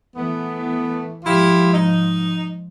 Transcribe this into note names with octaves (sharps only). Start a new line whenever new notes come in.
E3 A3 B3
G#2 F3 E4 F4 G4
D#4